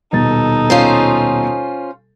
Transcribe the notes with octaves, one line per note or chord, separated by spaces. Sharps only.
D#1 B2 D#4 A4 A6
C#4 F4 C5